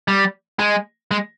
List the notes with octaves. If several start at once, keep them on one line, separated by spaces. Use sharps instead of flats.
G3
G#3
G#3